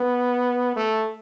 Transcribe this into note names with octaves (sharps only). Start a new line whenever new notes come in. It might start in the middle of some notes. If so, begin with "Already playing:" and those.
Already playing: B3
A3